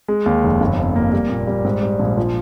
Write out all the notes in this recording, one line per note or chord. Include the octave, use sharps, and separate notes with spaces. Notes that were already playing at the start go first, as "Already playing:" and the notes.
G#3
D#2
F1
G1
F2
A#3
G3
A#2
G3
G#2
G3
A#1
F3